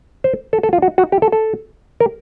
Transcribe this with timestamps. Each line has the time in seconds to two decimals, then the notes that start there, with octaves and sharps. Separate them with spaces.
0.24 C5
0.53 A4
0.63 A4
0.73 F4
0.82 F#4
0.98 F#4
1.12 G4
1.22 A4
1.32 A4
2.00 A#4